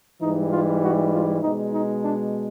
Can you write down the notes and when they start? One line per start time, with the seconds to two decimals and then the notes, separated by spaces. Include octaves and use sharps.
0.21 G#2 E3 G3 D#4
0.51 F4
0.82 F#4
1.12 F4
1.42 B2 G#3 D#4
1.72 D#4
2.03 D4